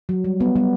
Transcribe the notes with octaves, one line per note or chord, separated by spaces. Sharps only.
F#3
G3
G3 B3
G3 B3